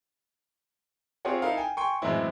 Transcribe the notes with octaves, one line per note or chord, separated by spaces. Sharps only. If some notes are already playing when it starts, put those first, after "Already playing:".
C4 F4 G4 G#4 C#5 F#5
D#4 E4 A4 A#4 F5
G5 G#5
G5 G#5 C6 C#6
F#2 A2 E3 G#3 C4 E4